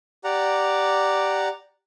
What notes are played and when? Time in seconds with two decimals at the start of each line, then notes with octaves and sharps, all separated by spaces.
0.24 G4 D5 F#5 A#5